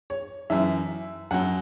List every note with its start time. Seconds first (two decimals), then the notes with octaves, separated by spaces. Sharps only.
0.10 C#5
0.50 F#2 E3 E5
1.31 F#2 F#3 F#5